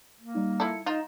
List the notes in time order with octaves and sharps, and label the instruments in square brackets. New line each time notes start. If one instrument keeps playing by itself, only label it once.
[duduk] A#3
[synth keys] G3 D#4
[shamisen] E4 F4 A4 [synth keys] G#6 C#7
[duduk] D#4 [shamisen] F4 [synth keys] E7